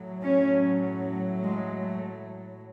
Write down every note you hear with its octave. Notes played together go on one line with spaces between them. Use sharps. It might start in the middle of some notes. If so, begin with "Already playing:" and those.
Already playing: A2 F#3
C#4
G#3
A3